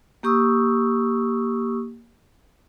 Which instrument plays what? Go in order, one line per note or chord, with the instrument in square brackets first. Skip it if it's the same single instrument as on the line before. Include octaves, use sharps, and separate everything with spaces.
[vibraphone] A#3 G4 C#6 D#6 E6